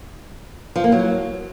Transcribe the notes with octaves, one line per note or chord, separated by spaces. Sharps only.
F3
A#3
F#3